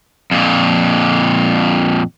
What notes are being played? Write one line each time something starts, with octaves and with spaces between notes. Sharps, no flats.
F2 A#2